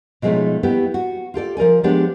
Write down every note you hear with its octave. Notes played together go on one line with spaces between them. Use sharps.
B2 F3 G#3 A3 C#4 D#4
A3 B3 E4 G4
F#4
F4 G4 A4 D5
F3 A#4 D5 G#5
F3 G#3 B3 D4 G4